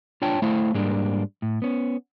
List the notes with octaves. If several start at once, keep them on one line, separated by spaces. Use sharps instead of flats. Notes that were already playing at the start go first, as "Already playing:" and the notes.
D4 F4 C#5 G5 A5
A3 E4 C5 F5
G#2 G3 G#3 A#3 D4
A2
B3 C#4